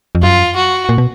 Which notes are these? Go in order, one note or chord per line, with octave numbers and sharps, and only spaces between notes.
F2
F#2 F4
F#4
A#2
B2